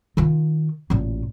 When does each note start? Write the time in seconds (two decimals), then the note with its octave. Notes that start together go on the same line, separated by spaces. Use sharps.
0.17 D#3 F4
0.90 A1 A#2